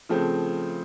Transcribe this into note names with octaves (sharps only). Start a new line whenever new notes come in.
C#3 F3 A3 C4